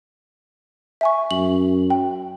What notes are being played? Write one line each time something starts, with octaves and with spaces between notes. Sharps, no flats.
E5 G#5 C#6
F#2 F#7
G5